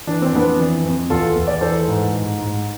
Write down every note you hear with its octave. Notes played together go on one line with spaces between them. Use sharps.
E3 D4
C4
F2 B3 D4
E3
F2
E2 F4 A4
E2
D5
E3 A4 C5
G#2
G#2
G#2